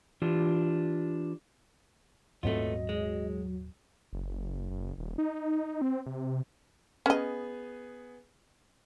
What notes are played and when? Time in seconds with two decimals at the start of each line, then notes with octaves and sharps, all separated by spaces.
0.22 E3 D4 F4 G4
2.43 D#1 G#2 F#3 A3 B3 C4 F4 D#5
2.89 G#3
4.13 F#1
4.70 F#1
4.98 D#1
5.18 D#4
5.82 C4
6.06 C3
7.06 B3 C#4 G#4 D#5